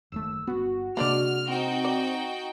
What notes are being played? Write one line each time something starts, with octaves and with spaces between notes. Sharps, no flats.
F#1 D#2 A3 E6
G1 B3 F#4
C3 G#3 A#3 D4 D5 F6
C4 D#4 F#4 G5
D5